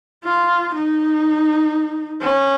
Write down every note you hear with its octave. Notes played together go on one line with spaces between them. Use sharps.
F4
D#4
C#4